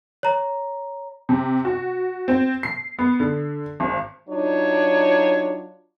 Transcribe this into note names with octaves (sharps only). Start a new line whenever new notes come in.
C#5 A#5
C3
F#4
C4
C7
B3
D3
G#1
F#3 D4 D#4 F4 C#5